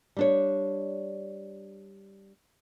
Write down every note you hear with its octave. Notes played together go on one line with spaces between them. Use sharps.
G3 D4 C#5